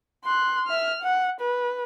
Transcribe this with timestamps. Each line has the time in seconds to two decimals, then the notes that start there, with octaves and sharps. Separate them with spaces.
0.24 C6 F#6
0.67 E5 F6
1.02 F#5
1.41 B4